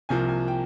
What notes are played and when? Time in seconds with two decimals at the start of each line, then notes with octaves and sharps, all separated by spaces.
0.09 C2 C3 F3 A#3 G#5
0.29 G#5
0.48 G5